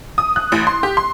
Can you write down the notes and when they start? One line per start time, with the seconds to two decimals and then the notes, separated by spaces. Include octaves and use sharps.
0.18 D#6
0.36 F#6
0.52 A1
0.67 C6
0.83 G4
0.97 C6